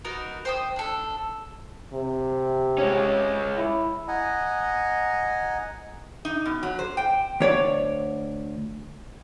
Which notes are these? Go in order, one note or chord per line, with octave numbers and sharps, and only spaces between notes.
B3 D#4 F#4 A#4
C5 G5 D#6
D4 A4
C3
G#3 C#4
E4
D#5 F#5 G#5 A#5
D#4
B2
F#3
C5
G5
D2 C#5 D5